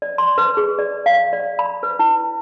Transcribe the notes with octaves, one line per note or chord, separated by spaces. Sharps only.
D5
C6
B4
G#4
D5
F5
D5
B5
B4
E4